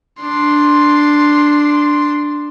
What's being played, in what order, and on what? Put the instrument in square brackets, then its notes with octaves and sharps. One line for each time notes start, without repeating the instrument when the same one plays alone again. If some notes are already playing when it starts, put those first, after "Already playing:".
[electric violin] D4 C6